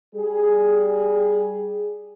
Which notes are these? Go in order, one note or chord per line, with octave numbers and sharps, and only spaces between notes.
G3 G#4